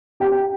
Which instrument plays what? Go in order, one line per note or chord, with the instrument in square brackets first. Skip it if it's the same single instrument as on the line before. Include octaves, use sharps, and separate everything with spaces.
[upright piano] G4 G5